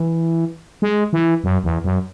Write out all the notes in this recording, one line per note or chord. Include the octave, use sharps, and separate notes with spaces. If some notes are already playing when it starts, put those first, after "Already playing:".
Already playing: E3
G#3
E3
F#2
E2
F#2